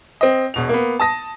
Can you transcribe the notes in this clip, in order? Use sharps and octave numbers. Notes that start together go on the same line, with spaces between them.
C4 D#5
E1 B2 F7
A#3 B3
A5 D#6 A#6